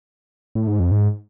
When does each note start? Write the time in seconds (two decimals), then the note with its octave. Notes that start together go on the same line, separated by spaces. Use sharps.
0.55 A2
0.67 G#2
0.80 F2
0.91 G#2